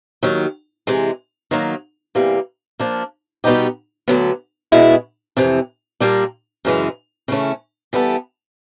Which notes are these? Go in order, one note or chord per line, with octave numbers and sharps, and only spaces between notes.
D#2 D#3 F#3
C3 E3 G#3
D#3 F#3 A#3
E2 C3 E3 G3 A#3
F3 A#3 D4
B2 G3 B3 D#4 G4
D2 D3 F#3 B3
B2 G#3 B3 E4 G#4
F2 C3 E3
A#2 G3 A#3 D4
F#2 C#3 E3 G#3
C#3 E3 A3 C#4
E3 G3 B3 E4 A4